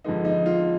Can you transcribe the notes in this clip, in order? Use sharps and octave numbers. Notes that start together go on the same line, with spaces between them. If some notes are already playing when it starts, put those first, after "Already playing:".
F2 D3 G#3 B3 D#4
D#4
F4